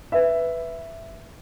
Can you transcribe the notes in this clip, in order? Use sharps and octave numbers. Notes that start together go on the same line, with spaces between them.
B4 E5